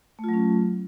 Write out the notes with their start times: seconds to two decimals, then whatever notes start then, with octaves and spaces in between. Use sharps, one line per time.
0.19 A3
0.24 F4
0.29 F#3
0.34 C#4